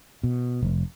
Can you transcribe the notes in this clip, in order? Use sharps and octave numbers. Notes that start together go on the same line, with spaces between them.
B2
F1